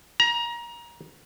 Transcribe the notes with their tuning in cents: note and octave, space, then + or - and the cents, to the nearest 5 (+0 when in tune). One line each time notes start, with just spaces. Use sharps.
A#5 +25